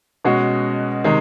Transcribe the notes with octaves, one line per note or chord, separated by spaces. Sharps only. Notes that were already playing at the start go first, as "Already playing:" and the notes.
B2 G#3 C#4 F#4
C3 D#3 G#3